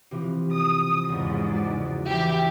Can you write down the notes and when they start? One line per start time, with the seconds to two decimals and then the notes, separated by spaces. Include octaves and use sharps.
0.11 C3 E3 F3
0.53 D#6
1.09 E2 G#2 C#3 F3
1.52 F#4 D5
2.06 E3 G4 E5